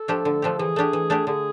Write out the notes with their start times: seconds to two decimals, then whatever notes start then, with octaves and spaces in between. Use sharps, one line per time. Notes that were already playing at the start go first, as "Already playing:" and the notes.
Already playing: A4
0.08 F3 A3 D4 G4
0.25 D3
0.42 F3 A3 D4 G4
0.59 E3 G#4
0.76 A3 D4 G4
0.93 E3
1.10 A3 D4 G4
1.27 D3 G#4